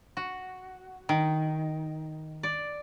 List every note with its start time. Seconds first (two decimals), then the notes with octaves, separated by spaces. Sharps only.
0.17 F#4
1.09 D#3
2.43 D5